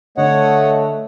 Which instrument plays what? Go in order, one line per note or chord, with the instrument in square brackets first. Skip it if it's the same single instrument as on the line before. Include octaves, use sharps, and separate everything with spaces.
[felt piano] D3 [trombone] A3 [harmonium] C#5 D#5 F#5